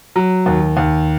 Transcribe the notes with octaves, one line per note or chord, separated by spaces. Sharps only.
F#3
D#2
D#2